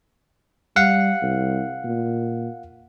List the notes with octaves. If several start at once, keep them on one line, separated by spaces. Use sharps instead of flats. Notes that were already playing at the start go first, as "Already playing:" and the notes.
G3 F5 F#5
C2
A#2